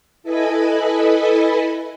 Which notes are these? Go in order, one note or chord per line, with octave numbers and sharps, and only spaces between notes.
E4 A4 B4 D#5 G#5 B5